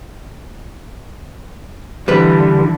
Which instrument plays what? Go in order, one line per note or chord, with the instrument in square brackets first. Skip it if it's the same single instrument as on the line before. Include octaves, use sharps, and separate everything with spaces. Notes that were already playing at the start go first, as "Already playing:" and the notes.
[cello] D3 E3 [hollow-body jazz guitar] G3 B4